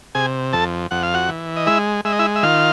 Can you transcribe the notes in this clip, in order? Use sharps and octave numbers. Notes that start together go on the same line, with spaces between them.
C3 G#4 G#5
F2 A4 A5
F2 F#5
F5
F#4 F#5
E3
D#5
G#3 E4 E5
G#3 E5
D#5
E4 E5
E5
D#3 F4 F5